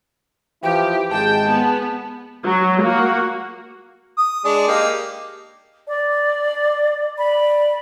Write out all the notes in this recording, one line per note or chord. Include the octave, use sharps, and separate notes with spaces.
E3 F3 E4 G4 G5
G#1 G#3 G5 A5
B3
F#3
A#3 F#4
D#6
G#3 D4
A#3 D#4 G4
D5
D5 B5